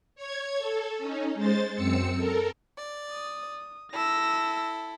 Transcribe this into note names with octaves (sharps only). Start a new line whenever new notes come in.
C#5 G#6
A4
C#4 D#4
G#3 C5 A6
F#2 C4 E6 C#7
A4 A#4
D5
D#6
E4 A4 E6 A#6